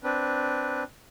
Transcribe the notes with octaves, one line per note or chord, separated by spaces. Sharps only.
C4 D4 B4